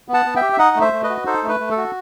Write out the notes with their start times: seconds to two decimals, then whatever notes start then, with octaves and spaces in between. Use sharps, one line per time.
0.08 B3
0.14 F#5 A5
0.26 B3
0.36 E5 G5
0.42 G4
0.53 E5
0.59 D#4 D#5 F#5
0.76 A3
0.81 C5 E5
0.93 A3
1.04 B4 D#5
1.09 F#4
1.26 D#4 A4 C5
1.43 A3
1.49 B4
1.60 A3
1.71 A4
1.77 F#4